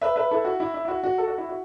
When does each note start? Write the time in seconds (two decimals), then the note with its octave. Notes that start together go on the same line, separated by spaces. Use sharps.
0.01 B4 E5
0.16 B4 E5
0.31 E4 A4
0.45 F#4
0.60 E4
0.74 E4
0.85 E4
0.88 F#4
1.03 F#4
1.18 A4
1.28 F#4
1.38 E4
1.49 F#4